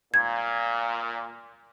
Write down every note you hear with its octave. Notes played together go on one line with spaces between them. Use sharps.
A#2 G#6